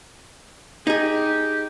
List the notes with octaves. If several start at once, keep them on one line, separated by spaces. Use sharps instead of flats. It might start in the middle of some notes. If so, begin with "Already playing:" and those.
D#4 G4 G#4